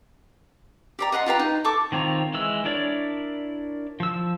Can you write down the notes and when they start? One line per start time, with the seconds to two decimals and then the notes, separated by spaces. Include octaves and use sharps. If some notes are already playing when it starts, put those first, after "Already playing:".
0.99 G4 D5 A#5
1.12 D#5 F#5 A#5 C6
1.26 F4 G4 B4 A#5
1.40 D#4
1.64 A4 C#6 D6
1.92 D#3 C4 F4 C#5 A#5
2.34 E3 G#3 E6
2.65 D4 E4 A#4 C#5 D5
4.00 F3 E6